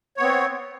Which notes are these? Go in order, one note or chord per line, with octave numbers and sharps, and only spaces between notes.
B3 C4 C#5